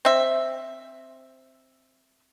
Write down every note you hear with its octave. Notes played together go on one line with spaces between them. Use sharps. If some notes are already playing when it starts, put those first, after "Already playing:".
C4 E5